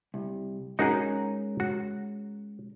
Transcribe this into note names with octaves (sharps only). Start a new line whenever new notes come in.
C2
G#3 C#4 D#4 F#4 G#4 A#4
F#4